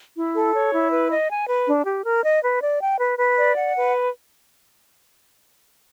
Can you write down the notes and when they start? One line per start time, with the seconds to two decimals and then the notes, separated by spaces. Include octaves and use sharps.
0.16 E4
0.34 A4
0.54 C#5
0.73 E4
0.91 B4
1.10 D#5
1.29 G#5
1.48 B4
1.67 D4
1.85 G4
2.05 A#4
2.24 D#5
2.42 B4
2.61 D5
2.80 G5
2.99 B4
3.18 B4
3.37 D5
3.56 F#5
3.75 B4